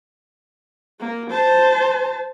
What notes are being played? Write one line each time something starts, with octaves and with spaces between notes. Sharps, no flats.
A#3
C5 A5